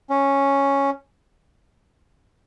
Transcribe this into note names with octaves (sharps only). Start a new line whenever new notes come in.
C#4